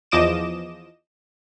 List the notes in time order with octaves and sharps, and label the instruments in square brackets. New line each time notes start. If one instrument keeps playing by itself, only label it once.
[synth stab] E2 F3 D#5 D6 E7